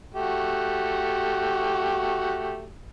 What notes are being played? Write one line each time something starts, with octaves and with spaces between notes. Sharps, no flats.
A3 F#4 G4